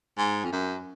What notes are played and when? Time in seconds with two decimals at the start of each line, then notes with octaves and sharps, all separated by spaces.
0.17 G#2
0.45 F2
0.52 F#2